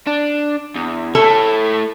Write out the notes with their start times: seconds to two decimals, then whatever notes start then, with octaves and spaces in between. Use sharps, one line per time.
0.07 D4
0.75 E2
1.15 A3 E4 A4